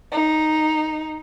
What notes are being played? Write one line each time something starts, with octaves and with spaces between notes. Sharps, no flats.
D#4